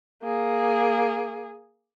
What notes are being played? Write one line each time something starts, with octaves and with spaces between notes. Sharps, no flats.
A#3 G#4